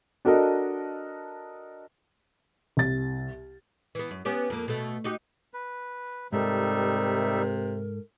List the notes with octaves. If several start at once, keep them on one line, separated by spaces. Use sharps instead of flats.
D4 F#4 A4 A#4 D#5
C2 A6
E3 B3
F#2
B3 C#4 G4
F2 A#3
B2 A3
D#4 F#4 G4
B4
G#2 C3 G3 D#4 A4 A#4 E5